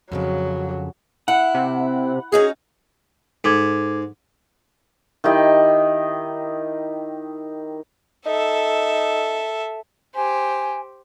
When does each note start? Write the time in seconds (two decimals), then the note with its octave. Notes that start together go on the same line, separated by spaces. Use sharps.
0.12 F2 A#2 C#3 F#3
1.28 E4 F#5
1.55 C3
2.32 C#4 D#4 F#4 G#4
3.44 G#2 A4 D6 G#6
5.24 D#3 E4 G4 D#5
8.26 D#4 A4 E5
10.15 G4 C5 G#5